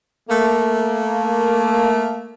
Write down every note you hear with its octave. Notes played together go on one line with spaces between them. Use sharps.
A3 A#3